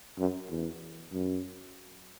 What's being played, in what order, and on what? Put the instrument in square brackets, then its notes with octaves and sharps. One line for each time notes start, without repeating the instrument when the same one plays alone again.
[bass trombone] F#2
E2
F#2